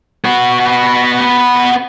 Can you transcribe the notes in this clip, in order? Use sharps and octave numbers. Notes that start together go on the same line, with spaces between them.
B3 F#4